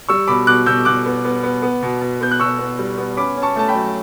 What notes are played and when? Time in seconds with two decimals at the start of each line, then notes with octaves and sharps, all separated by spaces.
0.09 G3 C#6 E6
0.27 B2 B5 D6
0.47 B2 D6 F#6
0.66 B2 E6 G6
0.85 B2 D6 F#6
1.05 B3
1.25 B3
1.43 B3
1.62 B3
1.82 B2
2.01 B2
2.21 B3 G6
2.31 F#6
2.40 B2 C#6 E6
2.59 B3
2.79 G3
2.97 B3
3.16 C#4 B5 D6
3.36 C#4
3.42 A5 C#6
3.56 A3 A5
3.68 G5 B5
3.75 F#3